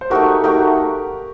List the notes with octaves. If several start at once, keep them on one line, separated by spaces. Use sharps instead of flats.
C5
A3 D#4 F#4 G4 A#4
A3 D#4 F#4 G4 A#4